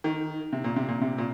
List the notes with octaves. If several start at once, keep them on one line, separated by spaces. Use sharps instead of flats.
D#3
C3
A#2
C3
A#2
C3
A#2